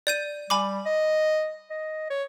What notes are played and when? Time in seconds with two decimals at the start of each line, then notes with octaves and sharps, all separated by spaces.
0.07 D5 G6 D#7
0.50 G3 G#5 B5 D6
0.86 D#5
1.70 D#5
2.10 C#5